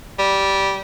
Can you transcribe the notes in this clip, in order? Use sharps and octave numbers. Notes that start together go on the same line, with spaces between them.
G3